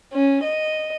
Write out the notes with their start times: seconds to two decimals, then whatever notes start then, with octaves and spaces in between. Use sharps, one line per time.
0.13 C#4
0.43 D#5